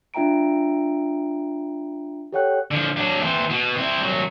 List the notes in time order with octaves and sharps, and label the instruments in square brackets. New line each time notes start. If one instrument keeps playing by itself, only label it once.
[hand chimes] D4 F4 E5 G5 A#5 D7
G4 A4 C#5 F#5 G5 F#6
[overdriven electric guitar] D3 F3
F#3 D4
E3 C4
B2 B3
C4 E4
C2 F#3